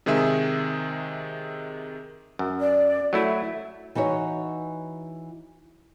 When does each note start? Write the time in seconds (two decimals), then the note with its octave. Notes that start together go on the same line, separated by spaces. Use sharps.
0.06 C3 D#3 G#3 G#4 E5 E6
2.39 F#2
2.60 D5
3.13 F#3 A3 E4 E5
3.95 E3 D#4 F#4 C#5